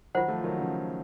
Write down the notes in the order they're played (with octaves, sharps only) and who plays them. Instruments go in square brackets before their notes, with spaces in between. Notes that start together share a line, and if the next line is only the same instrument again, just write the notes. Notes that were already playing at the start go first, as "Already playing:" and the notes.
[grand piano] D#3 F#3 [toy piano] F4 C5 F#5
[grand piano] F3 A3
D#3 F#3
C#3 F3